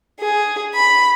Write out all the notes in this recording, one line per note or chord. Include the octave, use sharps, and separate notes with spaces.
G#4
B5